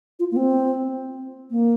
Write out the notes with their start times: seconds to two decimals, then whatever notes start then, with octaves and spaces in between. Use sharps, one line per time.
0.19 F4
0.32 A#3
0.36 C4
1.51 A#3